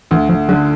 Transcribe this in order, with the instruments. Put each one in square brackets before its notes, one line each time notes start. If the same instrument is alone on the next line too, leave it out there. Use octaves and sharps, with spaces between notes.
[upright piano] D2 [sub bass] E3
[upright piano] D2 [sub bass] F3
[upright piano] D3 [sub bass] F#3